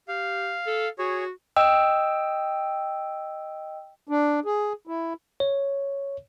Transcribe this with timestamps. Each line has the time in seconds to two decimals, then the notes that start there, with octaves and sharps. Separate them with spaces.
0.08 G4 F5
0.67 A4
0.99 F#4 G#4 C#5
1.56 D#5 G5 E6
4.09 D4
4.45 G#4
4.87 E4
5.40 C#5